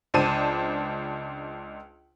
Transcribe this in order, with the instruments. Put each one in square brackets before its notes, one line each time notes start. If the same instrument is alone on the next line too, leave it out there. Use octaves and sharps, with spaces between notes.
[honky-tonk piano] C#2 D4 C5 A5 D#7